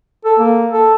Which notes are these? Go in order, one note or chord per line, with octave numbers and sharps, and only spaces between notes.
A4
A#3
A4